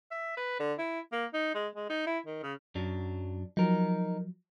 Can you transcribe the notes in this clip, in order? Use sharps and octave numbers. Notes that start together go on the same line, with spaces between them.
E5
B4
D3
E4
A#3
D#4
G#3
G#3
D#4
E4
D#3
C#3
F#2 F#3 D4
F3 F#3 D#4 A#4